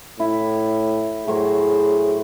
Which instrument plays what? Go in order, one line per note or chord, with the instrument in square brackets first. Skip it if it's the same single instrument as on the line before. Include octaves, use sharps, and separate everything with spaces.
[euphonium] A2 [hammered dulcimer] E4
[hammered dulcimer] A2 F#3 C5 [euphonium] G#4